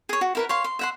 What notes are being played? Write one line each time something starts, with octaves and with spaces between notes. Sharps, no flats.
G#4 C#5
F#4
E4 A#4 B4
C#5 F5 C6
C6
E5 F#5 C6